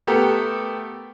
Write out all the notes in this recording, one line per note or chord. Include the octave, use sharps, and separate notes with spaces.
A3 B3 G4 A4 A#4